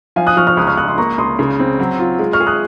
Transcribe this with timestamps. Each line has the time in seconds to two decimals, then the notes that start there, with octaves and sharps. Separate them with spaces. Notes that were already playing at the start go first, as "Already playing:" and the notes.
0.16 F3 F5 G#5
0.27 D#6 F#6
0.37 F3 C#6 F6
0.47 C#6 F6
0.57 C#2 D#6 F#6
0.67 C#6 F6
0.77 C#2 D#6 F#6
0.88 C6 D#6
0.98 A#3 A#5 C#6
1.18 C#2 C6 D#6
1.39 C#3
1.59 C4
1.79 F#3
1.99 F4
2.19 G#3
2.33 C#6 F6
2.40 G#4
2.47 D#6 F#6